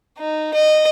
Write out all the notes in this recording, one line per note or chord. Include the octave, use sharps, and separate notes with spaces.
D#4
D#5